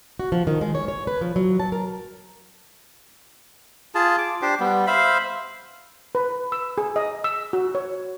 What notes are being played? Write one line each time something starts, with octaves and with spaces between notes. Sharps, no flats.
F#4
F3
D#3
G#3
C#5
C#5
B4
F3
F#3
A5
A#4
F4 G#4 A5
D6
D4 G4 C5
G3 B3
C5 E5 F5 B5
B4
E6
G#4
D#5
E6
F#4
C#5